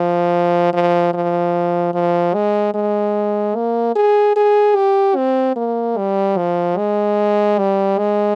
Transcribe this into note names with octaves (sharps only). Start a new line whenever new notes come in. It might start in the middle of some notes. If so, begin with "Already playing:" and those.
Already playing: F3
F3
F3
F3
G#3
G#3
A#3
G#4
G#4
G4
C4
A#3
G3
F3
G#3
G3
G#3